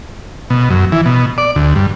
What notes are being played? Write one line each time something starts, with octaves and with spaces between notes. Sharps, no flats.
B2
F#2
E3
B2
D5
D2
G2